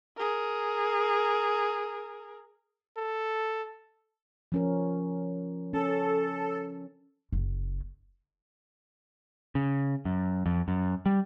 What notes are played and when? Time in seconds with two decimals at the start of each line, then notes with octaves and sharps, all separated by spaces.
0.17 G#4 A#4
2.97 A4
4.52 F3 C#4 A#4
5.73 C#4 A4
7.32 F#1
9.55 C#3
10.05 F#2
10.46 F2
10.68 F#2
11.06 G3